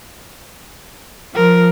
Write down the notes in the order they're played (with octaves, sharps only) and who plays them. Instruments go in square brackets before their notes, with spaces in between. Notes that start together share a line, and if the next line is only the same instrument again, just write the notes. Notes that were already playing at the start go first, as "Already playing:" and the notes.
[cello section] F3 [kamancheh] A#4